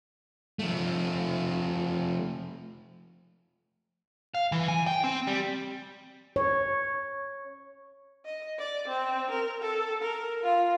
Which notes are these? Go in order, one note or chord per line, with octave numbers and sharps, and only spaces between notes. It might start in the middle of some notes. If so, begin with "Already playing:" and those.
F3 A3
F5
E3
G#5
G5
C4
G3
C#5
D#5
D5
C4
A#4
A4
A#4
F4